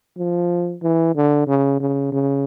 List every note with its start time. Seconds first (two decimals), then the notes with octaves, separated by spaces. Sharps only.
0.18 F3
0.83 E3
1.16 D3
1.47 C#3
1.80 C#3
2.12 C#3